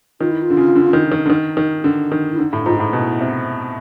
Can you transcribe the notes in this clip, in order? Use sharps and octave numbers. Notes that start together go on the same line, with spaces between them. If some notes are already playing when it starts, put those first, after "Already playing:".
D#3 F4
E4
F4
D3
C#3
D3
D#3
D#3
D3
D#3
D#3
D3
D#3
E4
D3 D#4
A2
G#2 F4
A2
B2 E4
C3